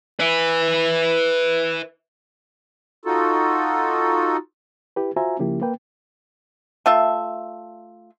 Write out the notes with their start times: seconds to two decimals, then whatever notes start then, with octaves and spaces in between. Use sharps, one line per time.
0.20 B4 E5
3.05 D#4 F4 F#4 A4
4.96 E4 G4 B4
5.16 F4 F#4 C5 E5 G#5 A#5
5.39 C#3 F3 A#3 E4 G4
5.61 A#3 B4 G5
6.86 A3 F4 E5